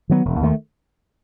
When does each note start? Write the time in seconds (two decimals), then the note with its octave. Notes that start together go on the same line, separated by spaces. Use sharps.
0.09 D#3 F#3 B3
0.25 E1
0.41 D#2 D#3 A3